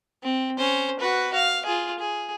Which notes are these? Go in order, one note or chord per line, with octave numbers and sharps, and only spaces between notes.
C4
C#4 C5
F#4 B4
F5
F4 G#4
G#4